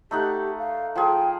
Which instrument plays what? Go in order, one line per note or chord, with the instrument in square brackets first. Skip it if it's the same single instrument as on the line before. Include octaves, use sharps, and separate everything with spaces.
[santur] A3 D#4 F#5 [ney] G4
[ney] F5
[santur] F3 G#4 [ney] G5